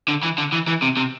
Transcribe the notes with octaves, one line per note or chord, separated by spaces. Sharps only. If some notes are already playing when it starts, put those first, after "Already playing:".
D3
E3
D3
E3
E3
C3
C3